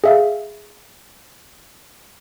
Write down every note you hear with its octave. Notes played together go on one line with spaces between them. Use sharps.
G#4 E5 F5